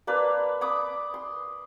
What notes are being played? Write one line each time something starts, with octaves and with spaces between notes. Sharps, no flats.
A#3 D4 B4
B5 D6 D#6
C6